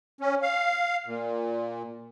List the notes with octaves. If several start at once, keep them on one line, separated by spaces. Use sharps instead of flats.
C#4
F5
A#2